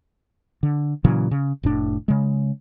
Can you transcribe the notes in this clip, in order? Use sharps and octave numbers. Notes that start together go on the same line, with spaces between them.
D3
A#2 C#3 E3 F#3
C#3
F1 A2 D4
C#3 G#3